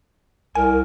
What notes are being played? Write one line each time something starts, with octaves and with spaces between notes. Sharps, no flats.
C2 A#4 G#5